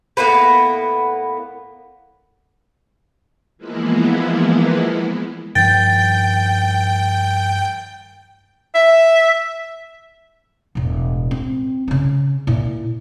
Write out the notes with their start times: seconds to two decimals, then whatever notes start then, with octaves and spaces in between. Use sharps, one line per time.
0.17 A2 A#3 B3 B4
3.58 E3 F3 G#3 A#3 B3 E4
5.55 G2 D#3 F3 G5 G6 A6
8.75 E5
10.75 E1 A2
11.31 C4
11.88 C#3 C#4
12.47 A#2 E4